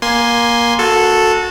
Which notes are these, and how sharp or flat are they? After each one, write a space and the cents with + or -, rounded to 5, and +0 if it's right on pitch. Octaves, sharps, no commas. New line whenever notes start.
A#3 +20 G#5 +0 C6 +0
F#4 -20 A4 +0